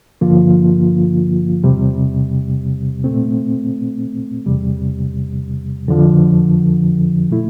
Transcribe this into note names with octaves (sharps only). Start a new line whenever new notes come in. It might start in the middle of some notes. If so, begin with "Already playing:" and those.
G2 D3 F3 A#3 F4
E2 C3 G3
A#2 A3 C4
E2 C3 G3
F2 D3 F3
A#2 A3 E4